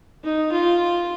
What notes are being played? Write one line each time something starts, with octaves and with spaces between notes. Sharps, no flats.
D#4
F4